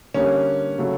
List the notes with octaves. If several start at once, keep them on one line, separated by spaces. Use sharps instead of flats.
D3 G3 A#3 C#4
C#3 F#3 A3